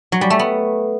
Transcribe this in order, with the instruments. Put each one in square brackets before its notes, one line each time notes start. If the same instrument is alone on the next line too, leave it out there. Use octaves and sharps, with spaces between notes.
[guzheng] F#3
G3
A3
B3